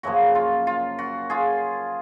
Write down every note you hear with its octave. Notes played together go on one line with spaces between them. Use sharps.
F#2 C#3 F3 A#3 F#4
F4
F4
F#4
F4 G#4